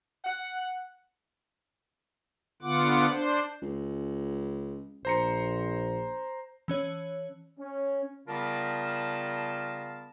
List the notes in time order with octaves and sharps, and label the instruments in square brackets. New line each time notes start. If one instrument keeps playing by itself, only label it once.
[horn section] F#5
[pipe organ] D3 B3 F4 F#5 D6
D4 C5
[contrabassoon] C#2
[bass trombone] A#1 [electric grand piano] C5 A#5 C#7
[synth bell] E3 C#4 C#5
[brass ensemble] C#4
[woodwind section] C#3 G3 B3 F4 A#4 A5